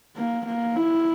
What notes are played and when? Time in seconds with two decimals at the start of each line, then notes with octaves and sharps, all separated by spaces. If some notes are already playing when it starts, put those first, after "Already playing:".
0.16 A#3
0.47 A#3
0.76 E4